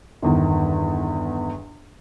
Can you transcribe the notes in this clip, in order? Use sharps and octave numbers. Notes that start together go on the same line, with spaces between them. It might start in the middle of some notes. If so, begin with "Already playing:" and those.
G1 E2 D#3